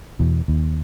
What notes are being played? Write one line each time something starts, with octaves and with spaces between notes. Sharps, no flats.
E2 B2
D#2